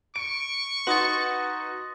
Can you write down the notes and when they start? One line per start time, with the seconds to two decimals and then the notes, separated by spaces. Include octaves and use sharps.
0.16 C#6 D7
0.87 D#4 F#4 B4 C6 D#6 A6